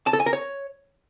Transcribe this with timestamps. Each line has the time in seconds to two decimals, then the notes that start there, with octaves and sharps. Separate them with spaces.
0.07 A5
0.13 A4
0.20 G#5
0.26 A#4
0.33 C#5